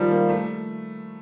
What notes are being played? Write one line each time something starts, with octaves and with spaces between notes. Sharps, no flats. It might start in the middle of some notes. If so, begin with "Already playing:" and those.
Already playing: D#3 F3 G3
A#3
A3